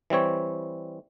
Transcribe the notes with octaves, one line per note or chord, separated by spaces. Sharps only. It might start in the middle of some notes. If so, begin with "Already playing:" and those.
E3 G3 C4 C#5